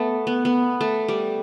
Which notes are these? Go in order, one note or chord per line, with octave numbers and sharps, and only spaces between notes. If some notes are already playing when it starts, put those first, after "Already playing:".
Already playing: A3 B3
B3
B3
A3
G3